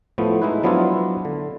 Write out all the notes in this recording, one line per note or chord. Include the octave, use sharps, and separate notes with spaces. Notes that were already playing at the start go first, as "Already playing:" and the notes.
A2 F3 A3 B3
G#3 D#4 E4 B4
F3 F#3 B3 D4 E4 F4
D3